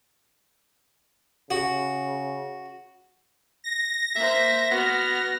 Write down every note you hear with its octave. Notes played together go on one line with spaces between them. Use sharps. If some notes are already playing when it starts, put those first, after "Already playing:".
C#3 F#4
A#6
A#3 C5 E5
B3 F#4 F6